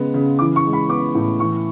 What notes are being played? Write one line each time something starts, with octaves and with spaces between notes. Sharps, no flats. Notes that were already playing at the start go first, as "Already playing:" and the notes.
Already playing: C#3 G#3 B3
C#3
E3 D6
C#6
G#3
B5
B3 D6
A2
E3 C#6